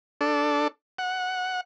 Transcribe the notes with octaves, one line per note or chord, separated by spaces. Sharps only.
D4 A4
F#5